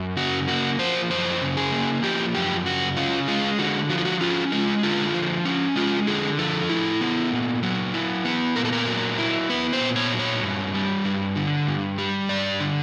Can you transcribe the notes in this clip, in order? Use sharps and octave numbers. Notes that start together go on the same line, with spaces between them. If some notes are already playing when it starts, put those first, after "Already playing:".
Already playing: F#2
C#3 F#4
A#3 F#4
F3 C5
F#2 C5
C#3
G#4
A#3
F3 G4
F#2 G4
C#3 F#4
C#4 F4
G#3 F4
D3 F#4
F3 F#4
F4
F#4
C#4 F4
G#3 F4
D3 F4
F3
C#4
G#3 F4
D3 G#4
F3 A4
E4
B3
A#2
F#3
E4
B3
A#2 A#4
A4
A#4
F#3
E4
B3 B4
C5
A#2
C#5
F#3
C#5
G2
G3
G2
D3
G2
G3
G2 D5
D3